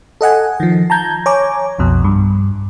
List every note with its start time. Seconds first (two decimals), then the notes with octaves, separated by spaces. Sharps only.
0.21 A4 D#5 F#5 G#5
0.60 D#3 F3
0.90 A5 A#5 G6 G#6
1.26 C#5 G#5 A#5 D6
1.79 B1 F2 B2
2.04 G2